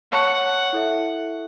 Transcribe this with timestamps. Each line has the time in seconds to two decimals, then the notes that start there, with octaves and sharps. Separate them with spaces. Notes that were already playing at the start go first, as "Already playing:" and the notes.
0.12 C#5 F#5 A5 C#6
0.73 E4 A4 E5